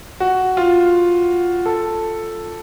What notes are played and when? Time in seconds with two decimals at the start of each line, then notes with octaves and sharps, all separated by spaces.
0.20 F#4
0.57 F4
1.66 A4